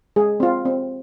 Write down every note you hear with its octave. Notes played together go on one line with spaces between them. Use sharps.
G#3 G#4
C4 F4
C4